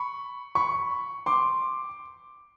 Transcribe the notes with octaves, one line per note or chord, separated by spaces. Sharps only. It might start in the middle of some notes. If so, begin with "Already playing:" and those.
Already playing: B5 C#6
B5 C#6
C6 D6